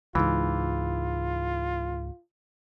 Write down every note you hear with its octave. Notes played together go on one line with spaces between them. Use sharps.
C#2 G#2 E3 F4